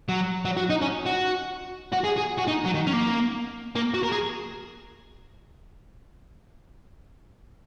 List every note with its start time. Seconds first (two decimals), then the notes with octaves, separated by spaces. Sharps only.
0.09 F#3
0.45 F#3
0.57 F#4
0.70 D#4
0.82 C#4
1.06 F#4
1.92 F#4
2.04 G#4
2.17 G#4
2.38 F#4
2.47 D#4
2.65 F#3
2.74 D#3
2.87 C#4
2.93 A#3
3.75 A#3
3.94 F#4
4.03 A#4
4.12 G#4